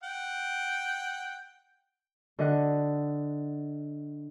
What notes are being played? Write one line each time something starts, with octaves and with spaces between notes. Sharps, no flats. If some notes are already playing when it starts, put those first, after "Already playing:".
F#5 G5
D3 D#5 F#5